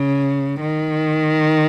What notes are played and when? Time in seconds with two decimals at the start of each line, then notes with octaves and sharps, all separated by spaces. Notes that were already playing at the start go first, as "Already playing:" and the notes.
Already playing: C#3
0.61 D#3